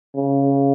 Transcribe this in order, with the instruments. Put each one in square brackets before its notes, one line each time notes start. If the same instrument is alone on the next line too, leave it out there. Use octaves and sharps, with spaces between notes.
[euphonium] C#3